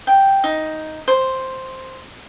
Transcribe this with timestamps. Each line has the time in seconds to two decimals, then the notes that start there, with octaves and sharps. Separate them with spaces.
0.07 G5
0.44 D#4
1.08 C5